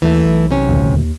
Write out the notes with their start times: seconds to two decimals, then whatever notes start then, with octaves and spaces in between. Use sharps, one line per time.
0.02 D#2 E3 A3
0.25 B1
0.51 C3 C#4
0.69 D#1 D2
0.94 D#2